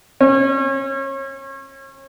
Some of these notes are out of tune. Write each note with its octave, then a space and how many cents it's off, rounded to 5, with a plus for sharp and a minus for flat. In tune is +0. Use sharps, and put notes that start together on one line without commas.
C#4 -30